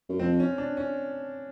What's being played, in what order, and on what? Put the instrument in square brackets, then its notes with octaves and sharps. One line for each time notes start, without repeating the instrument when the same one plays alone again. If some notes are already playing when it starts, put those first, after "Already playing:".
[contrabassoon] F#2
[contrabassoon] F2 [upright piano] C4
[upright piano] C#4
D4
C#4